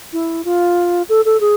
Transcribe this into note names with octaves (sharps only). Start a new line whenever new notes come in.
E4
F4
A4
A4
G#4